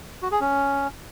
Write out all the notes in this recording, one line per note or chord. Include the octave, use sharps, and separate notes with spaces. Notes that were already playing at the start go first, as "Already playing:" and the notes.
F#4
G#4
C#4